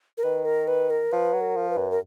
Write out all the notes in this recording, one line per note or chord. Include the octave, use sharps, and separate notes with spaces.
A#4
D#3 B4
A#4
B4
A#4
F3 B4
F#3
A#4
F3
B4
F#2
A#4